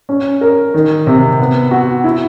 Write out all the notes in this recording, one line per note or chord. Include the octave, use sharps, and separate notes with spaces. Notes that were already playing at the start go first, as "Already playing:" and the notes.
C#4
A#4
D#3
C3
B3
F#4
E4